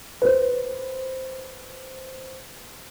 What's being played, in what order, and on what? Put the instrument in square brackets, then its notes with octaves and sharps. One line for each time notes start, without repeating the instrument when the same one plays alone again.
[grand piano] B4 C5